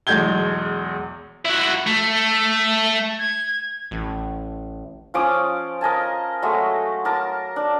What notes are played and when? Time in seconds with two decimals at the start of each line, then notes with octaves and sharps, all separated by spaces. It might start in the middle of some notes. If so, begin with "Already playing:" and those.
0.07 B1 E2 G#3 G6 G#6 G7
1.45 E4 F#4
1.87 A3
3.19 G#6
3.91 A1
5.14 F3 C#4 D6 D#6
5.81 A#4 D#5 G#5 A5
6.42 F#3 G#3 A3 D#5
7.05 A#4 A5 D6
7.56 D4